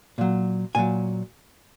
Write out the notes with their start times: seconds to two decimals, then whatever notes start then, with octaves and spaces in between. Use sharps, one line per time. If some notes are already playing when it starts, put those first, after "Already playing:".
0.18 A#2 F#3
0.75 A#2 F#3 G#5